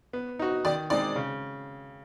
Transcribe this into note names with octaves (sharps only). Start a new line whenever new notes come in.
B3
D#4 F#4
D#3 D5
G#3 C4 D#4 D5
C#3